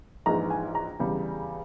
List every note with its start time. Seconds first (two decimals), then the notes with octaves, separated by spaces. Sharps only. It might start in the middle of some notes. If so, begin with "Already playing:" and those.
0.26 A#1 G#2 E3 G#3 A#5
0.50 G#5
0.75 A#5
0.99 E2 C#3 G3